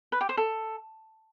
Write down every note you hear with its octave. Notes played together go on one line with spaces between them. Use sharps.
B4
G4
C5
A4